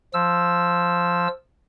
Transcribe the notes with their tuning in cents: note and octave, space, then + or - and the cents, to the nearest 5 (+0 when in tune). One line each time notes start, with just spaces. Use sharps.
F3 +0 E6 +0